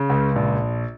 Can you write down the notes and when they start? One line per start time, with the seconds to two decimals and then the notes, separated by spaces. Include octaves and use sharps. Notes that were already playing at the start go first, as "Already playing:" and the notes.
Already playing: C#3
0.10 C#2
0.36 A#1